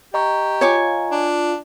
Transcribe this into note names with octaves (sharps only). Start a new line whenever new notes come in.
G4 D#5 A#5 C#6
F4 C#5 G#5 D6
D4